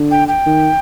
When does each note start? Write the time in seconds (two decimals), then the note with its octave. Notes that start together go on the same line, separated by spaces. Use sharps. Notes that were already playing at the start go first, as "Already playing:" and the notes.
Already playing: D3
0.11 G5
0.28 G5
0.46 D#3